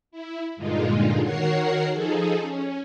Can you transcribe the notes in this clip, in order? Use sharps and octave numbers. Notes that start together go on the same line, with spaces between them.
E4
G2 A#2 D3 G#3 D#4 F4
D#3 F#4 A#4 C#5 F#5 C7
F3 D#4 G#4 A4
C#4